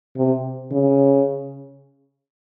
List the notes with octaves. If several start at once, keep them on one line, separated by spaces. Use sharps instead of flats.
C3
C#3